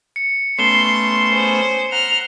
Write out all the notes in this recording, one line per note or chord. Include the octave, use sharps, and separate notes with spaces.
C#7
A3 B3 C#4 C6 C7 E7 G7
G#4 C5
F#5 A#5 F6